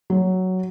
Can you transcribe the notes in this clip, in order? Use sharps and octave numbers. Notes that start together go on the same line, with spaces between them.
F#3